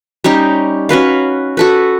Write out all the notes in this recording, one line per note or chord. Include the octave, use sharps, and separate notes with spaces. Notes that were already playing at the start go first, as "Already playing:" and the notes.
G3 C#4 D#4 G4
C#4 F#4 B4 F5
F#4 A4 B4